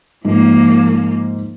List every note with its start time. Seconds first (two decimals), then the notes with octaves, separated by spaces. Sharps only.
0.25 G#2 F3 A#3